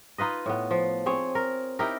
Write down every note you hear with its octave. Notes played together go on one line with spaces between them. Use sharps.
D#4 F4 B4 D#5
A2 B3
F3
C4 G#4 C#5
A#4
D#4 E4 G4 A#4